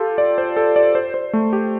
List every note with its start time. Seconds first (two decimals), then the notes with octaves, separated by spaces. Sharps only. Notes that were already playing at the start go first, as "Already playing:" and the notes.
Already playing: F4 G4 A4
0.18 D5
0.38 C5
0.56 A4
0.76 D5
0.95 C5
1.14 C5
1.33 A3
1.53 G4